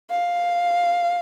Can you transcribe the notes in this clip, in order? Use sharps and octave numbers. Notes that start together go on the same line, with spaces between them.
F5